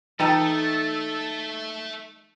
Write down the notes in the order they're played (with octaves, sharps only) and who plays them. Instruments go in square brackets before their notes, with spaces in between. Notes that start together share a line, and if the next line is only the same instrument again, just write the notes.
[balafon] E3 G5 A#5 [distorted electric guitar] A3 [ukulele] D#4 [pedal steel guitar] A4